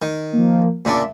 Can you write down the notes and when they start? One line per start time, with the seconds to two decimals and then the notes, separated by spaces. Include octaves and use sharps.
0.02 D#3
0.33 F3 A#3
0.85 A#2 C#3 D4 E5